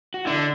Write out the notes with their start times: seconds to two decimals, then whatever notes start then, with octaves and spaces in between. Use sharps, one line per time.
0.14 F#4
0.25 D3 E4
0.36 D4